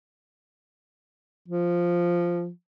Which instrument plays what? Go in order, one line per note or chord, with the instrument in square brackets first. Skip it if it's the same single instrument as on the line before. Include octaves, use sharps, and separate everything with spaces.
[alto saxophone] F3